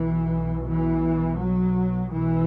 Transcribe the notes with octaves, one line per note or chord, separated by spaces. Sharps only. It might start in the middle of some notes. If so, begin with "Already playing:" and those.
Already playing: B1 B2 E3
E3
F#3
B1 E3
B2